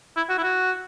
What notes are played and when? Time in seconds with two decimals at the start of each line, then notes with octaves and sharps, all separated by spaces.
0.16 E4
0.29 F#4
0.38 E4
0.43 F#4